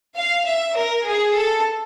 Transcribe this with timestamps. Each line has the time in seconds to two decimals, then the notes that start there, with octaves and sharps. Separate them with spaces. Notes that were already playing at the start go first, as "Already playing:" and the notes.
0.16 F5
0.46 E5
0.75 A#4
1.05 G#4
1.34 A4